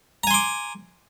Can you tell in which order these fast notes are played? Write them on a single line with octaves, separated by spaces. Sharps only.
A#5 G#5 C6 D6